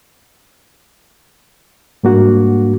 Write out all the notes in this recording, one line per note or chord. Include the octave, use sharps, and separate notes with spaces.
G#2 G3 A#3 D4 F#4